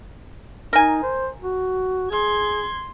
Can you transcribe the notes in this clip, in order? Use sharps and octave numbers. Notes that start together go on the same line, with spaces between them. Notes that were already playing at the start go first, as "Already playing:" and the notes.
D#4 A#4 G#5
C5
F#4
G#4 C6 G#6